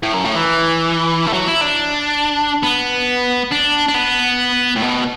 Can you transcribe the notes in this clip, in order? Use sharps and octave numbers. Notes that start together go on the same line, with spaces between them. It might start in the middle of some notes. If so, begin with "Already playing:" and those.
A2
F#2
A2
E3
A3
F#3
E4
D4
B3
D4
D4
B3
A2
B2